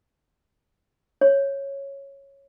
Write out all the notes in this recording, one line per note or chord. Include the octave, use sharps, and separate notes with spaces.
C#5